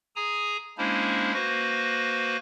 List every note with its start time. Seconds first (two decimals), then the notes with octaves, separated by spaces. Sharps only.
0.16 G#4 G#5 A#5 D#6
0.78 G#3 A#3 C#4 D4 E4 C5
1.34 A#3 F#4 B4 C5 A#6